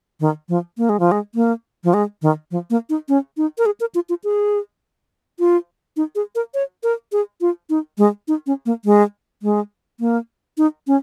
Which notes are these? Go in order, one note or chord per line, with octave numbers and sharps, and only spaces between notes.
D#3
F3
A#3
G#3
F3
G#3
A#3
F3
G#3
D#3
F3
A#3
D#4
C#4
D#4
A#4
G#4
A#4
F4
F4
G#4
F4
D#4
G#4
A#4
C#5
A#4
G#4
F4
D#4
G#3
D#4
C#4
A#3
G#3
G#3
A#3
D#4
C#4